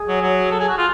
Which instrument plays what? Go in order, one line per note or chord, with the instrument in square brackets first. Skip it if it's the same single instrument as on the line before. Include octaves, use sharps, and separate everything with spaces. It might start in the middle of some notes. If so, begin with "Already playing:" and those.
Already playing: [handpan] G#4
[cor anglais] F#3
F#3
A4
G#4
F#4
F4